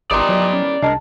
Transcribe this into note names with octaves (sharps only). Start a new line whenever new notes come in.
G#1 D#3 E3 G3 D5 A#5 C6 D#6
F#3
C#4
C2 G#3 D4 A#4 A5